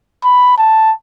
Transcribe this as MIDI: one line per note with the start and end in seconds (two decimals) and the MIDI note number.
0.24 0.53 83
0.58 0.92 81